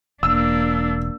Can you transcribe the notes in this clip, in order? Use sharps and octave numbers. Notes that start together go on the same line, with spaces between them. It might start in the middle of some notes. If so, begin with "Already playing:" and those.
E1 A#3 D4 E6